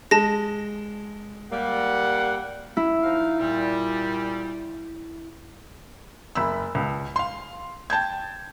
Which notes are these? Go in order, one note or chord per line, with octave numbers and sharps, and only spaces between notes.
G#3 A5 A#6
G3 A#3 F#5
E4
F3 D#4 F5
A#2 G3
F#1 B5 E6
C#2
F5 C6
G5 A5 G6 G#6